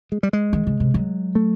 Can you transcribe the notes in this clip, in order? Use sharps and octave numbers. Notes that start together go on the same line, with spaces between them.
G#3
G3
G#3
D#3
C#3
C3
F#3
A3